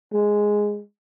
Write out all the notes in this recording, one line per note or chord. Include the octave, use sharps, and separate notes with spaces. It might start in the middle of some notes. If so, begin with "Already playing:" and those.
G#3